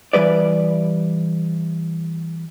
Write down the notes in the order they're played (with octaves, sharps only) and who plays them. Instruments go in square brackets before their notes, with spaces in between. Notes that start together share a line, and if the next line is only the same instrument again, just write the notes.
[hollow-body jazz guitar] E3 G3 B4 D5